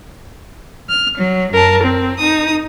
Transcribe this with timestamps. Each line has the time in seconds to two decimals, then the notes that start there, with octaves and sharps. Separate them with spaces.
0.88 F6
1.18 F#3
1.51 F#2 A#4 A5
1.82 C4
2.18 D#4 D#6